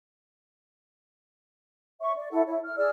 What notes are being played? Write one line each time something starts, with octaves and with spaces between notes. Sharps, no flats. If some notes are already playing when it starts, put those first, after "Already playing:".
C#5 E5 C#6
D5
E4 A4 F#5
E4 C#5
F6
G#4 D5 E6 F6